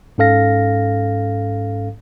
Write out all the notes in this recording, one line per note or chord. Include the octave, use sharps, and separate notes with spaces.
G#2 C#4 A4 F5 A#6